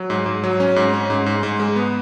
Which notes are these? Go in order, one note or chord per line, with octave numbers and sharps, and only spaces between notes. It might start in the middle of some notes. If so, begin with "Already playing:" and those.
Already playing: F#3
G#2
G#2
F#3
C#4
G#2
C#4
G#2
G#2
G#2
G#3
B3